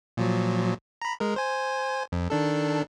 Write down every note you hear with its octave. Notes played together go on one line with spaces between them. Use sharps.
A#2 F3 F#3
A#5 B5
G#3 A#4
C5 G#5
F2
D#3 D4 A4